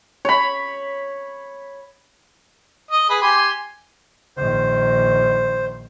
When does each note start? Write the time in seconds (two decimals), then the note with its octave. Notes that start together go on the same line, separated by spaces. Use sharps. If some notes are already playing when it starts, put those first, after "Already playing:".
0.25 C#5 B5
2.91 D#5
3.10 G#4 B4
3.22 G4 G#5 C6
4.37 A#1 D#3 C5